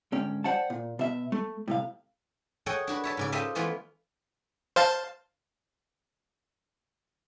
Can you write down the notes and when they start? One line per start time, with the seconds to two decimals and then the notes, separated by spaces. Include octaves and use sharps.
0.12 D2 G#2 C#4 G5
0.44 C5 D5 F#5 G5 A5
0.70 A#2
0.99 B2 E5
1.32 A3
1.68 A2 C3 F5
2.66 G#4 A4 C#5 D#5 F#5 G5
2.87 D4 F#4 B4
3.04 C#5 E5 A5
3.17 G#2 C#3 D5
3.32 F4 G4 A4 C5 D#5 E5
3.55 E3 G#3 A3 B3 F4
4.76 C5 F5 A5